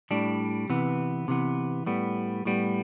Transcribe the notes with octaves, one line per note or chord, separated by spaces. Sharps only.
A2 G3 D4
C3 E3 B3
C3 E3 B3
A2 G3 B3
A2 G3 B3